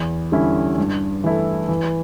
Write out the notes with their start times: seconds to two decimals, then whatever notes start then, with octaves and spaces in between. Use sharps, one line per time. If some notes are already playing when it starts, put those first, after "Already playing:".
Already playing: E2
0.32 D3 G3 C#4 E4
0.78 G2
1.24 E3 A3 E4 A4
1.69 E3